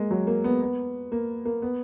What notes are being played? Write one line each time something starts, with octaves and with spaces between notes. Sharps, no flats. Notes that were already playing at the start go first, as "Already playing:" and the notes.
Already playing: G#3 A#3
F#3
A#3
B3
B3
A#3
A#3
B3